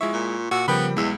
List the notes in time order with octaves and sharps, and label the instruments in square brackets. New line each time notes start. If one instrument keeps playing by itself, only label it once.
[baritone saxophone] F3 [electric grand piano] G#3 E4 E5 [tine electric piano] C#6
[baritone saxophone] A#2
[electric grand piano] A#2 E6 [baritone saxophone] F#4
[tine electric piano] C#3 F3 A#4 [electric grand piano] G3 G5 B5 [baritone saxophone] B3
[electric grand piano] B1 E6 [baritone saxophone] E2 [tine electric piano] G#3